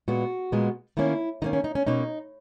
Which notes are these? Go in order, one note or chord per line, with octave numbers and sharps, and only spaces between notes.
A#2 G#3 B3 F#4
A#2 G#3 B3
D#3 A#3 C#4 E4
D#3 A#3 C#4 D#4
C#4
D#4
C#4
B2 A#3 C#4 D#4